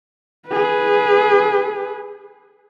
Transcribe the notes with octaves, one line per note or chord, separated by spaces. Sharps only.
G#4 B4